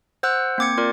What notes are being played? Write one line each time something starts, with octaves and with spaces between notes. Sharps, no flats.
C5 F#5 E6 F#6
A#3 C4 D6 G#6 C#7
F4 A#4 D5